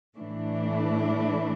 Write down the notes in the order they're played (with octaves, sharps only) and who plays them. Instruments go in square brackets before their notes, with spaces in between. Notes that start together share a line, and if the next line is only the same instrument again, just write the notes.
[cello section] A2 E3 A3 D4